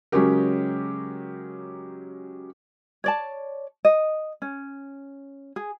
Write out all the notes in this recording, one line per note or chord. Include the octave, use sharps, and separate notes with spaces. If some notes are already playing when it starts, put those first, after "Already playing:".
C#3 F#3 G#3 C#4 G4 A#4
C#5 D5 A5
D#5
C#4
G#4